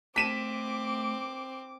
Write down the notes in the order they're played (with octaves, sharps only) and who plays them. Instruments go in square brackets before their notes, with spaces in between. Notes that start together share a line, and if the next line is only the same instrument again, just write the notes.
[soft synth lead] A3 [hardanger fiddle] C4 [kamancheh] D6 [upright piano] B6 D#7 E7